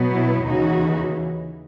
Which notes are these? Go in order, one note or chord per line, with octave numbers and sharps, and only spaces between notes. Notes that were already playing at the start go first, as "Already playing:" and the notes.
Already playing: B2 F#3 B3
E4
D#2 C#3 E3 D#4 F#4